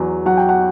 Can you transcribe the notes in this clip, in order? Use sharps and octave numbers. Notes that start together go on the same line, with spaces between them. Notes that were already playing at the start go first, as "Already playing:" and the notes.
Already playing: E2 F#3
F#3 F#5
G5
F#5